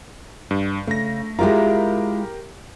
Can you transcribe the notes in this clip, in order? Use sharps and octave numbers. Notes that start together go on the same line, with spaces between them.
G2
C#3 A3 A#6
G#3 E4 F4 G4 A#4 A#5